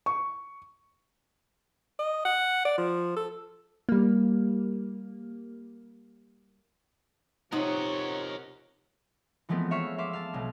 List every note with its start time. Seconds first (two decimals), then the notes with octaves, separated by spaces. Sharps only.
0.06 C#6
1.99 D#5
2.25 F#5
2.65 D5
2.78 F3
3.16 A4
3.89 G3 A#3
7.52 C3 F3 D#4 A#4 C#5 F#5
9.49 E3 F3 G#3 A3 B3 C4
9.71 C#5 E5 F5 C#6
9.98 E5 F5 C6 D6
10.13 F5 A5
10.33 B1 G#3